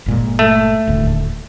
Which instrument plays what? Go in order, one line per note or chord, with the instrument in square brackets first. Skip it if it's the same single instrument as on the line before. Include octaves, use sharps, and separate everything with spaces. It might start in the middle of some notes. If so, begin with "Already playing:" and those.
[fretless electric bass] G1 A#2 G#3
[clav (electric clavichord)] A3
[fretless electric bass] D#1 D2 A2